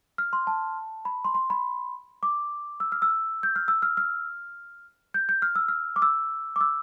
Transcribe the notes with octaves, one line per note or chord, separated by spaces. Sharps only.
F6
C6
A5
B5
C6
C6
B5
D6
E6
F6
E6
G6
F6
E6
F6
F6
G6
G6
F6
E6
F6
D6
E6
D6
E6